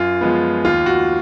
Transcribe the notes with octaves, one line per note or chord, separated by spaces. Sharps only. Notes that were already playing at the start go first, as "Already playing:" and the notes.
Already playing: F#2 F4
F3 G#3 B3
D#2 F4
F#4